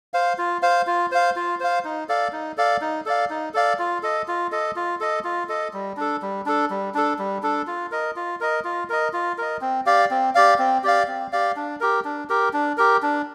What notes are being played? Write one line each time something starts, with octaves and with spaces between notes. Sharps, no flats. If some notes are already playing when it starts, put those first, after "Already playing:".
C5 F5
F4
C5 F5
F4
C5 F5
F4
C5 F5
D#4
A4 D5 F5
D#4
A4 D5 F5
D#4
A4 D5 F5
D#4
A4 D5 F5
F4
A4 D#5
F4
A4 D#5
F4
A4 D#5
F4
A4 D#5
G3
D4 A4
G3
D4 A4
G3
D4 A4
G3
D4 A4
F4
A#4 D#5
F4
A#4 D#5
F4
A#4 D#5
F4
A#4 D#5
C4
G4 D5 F5
C4
G4 D5 F5
C4
G4 D5 F5
C4
G4 D5 F5
D4
G4 A#4
D4
G4 A#4
D4
G4 A#4
D4